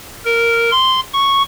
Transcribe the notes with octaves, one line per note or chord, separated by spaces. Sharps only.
A#4
C6
C#6